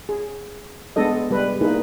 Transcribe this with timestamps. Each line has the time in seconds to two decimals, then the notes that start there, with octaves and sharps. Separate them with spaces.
0.09 G#4
0.96 G#3 B3 D4 A4 D#5
1.31 G3 B4
1.61 A#3 D#4 E4 G#4 B4